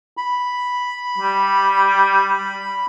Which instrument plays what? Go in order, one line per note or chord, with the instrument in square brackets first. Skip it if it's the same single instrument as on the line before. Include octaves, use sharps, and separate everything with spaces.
[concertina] B5
[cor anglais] G3